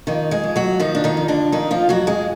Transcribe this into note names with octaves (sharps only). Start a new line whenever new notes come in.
F2 D#3 D#4
G#3 G#4
F2
F#3 F#4
D#3 F3 D#4
D4
D#3 D#4
F2
D3 D4
F2 D#3 D#4
F3 F4
F2 F#3 F#4
G#3 G#4